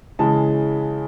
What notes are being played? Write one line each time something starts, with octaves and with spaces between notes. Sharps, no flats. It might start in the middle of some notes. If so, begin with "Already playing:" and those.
C#3 E3 G#3 A5